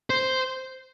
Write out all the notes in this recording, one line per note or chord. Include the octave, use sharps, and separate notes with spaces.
C5